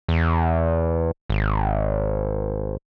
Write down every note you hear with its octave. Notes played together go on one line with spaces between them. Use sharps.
E2
G#1